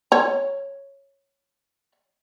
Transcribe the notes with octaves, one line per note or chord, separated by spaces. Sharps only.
C#5 A#5